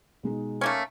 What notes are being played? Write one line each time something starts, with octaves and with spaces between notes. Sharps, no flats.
B2 G#3 D#4
A3 A#3 C#4